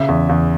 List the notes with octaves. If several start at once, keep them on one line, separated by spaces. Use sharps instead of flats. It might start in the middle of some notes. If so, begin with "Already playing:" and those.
Already playing: C#3 E5
E2
E2